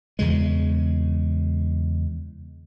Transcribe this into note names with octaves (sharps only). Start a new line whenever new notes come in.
E2 C#3 G#3